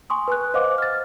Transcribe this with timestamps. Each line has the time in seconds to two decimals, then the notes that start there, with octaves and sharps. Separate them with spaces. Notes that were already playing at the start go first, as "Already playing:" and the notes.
0.10 G#5 C6 C#6 D#6
0.28 B4 G#5 F#6
0.54 C5 D#5 F5 F#5 D6
0.78 F6 A6